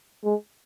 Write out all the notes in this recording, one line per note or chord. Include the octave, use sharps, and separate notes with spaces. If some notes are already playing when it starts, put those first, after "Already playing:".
G#3